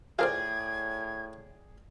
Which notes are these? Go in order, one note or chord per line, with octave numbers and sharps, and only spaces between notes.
A2 F4 G#4 A#4 C5 D5 G5 G#6